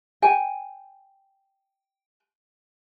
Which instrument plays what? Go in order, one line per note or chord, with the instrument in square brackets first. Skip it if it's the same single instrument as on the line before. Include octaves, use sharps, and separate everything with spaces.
[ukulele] G5 G#5